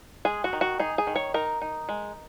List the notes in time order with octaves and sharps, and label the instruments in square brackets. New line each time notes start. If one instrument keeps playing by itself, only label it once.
[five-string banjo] G#3 G#4
F#4
D#3
F#4
D#4 G#4
G#4
D#3
C#5
D#4 A#4
D#4
G#3